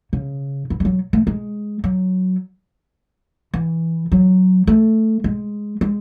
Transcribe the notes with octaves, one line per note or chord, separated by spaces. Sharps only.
C#3
E3
G#3
F#3
A3
G#3
F#3
E3
F#3
A3
G#3
G#3